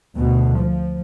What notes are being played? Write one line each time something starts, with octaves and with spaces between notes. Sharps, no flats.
D2 B2
F3